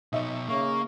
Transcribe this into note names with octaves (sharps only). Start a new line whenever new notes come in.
B2 D#4 C#5 E5
C#3 A#3 C#6